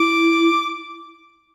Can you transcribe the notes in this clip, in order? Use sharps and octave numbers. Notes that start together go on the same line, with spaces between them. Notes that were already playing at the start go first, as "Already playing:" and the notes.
Already playing: E4 D6